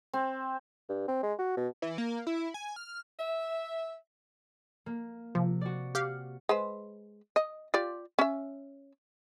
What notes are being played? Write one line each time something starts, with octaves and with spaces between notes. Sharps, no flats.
C4
G2
C4
G#3
F#4
B2
E3
A#3
E4
G#5
F6
E5
A#3
C3 F3
F#4 D5
G4 F5 F#5
G#3 B4 C5
D#5
F4 G4 D5
C#4 E5